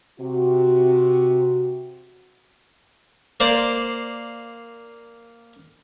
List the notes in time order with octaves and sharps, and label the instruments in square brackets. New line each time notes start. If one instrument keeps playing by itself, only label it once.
[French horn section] C3 F#4
[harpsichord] A#3 C5 D5